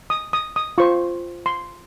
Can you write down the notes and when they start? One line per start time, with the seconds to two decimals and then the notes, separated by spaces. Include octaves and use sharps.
0.10 D#6
0.33 D#6
0.56 D#6
0.78 F4 C5 C#6
1.46 C6